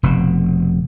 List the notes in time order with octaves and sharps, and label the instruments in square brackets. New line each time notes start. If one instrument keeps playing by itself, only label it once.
[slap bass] F1 B2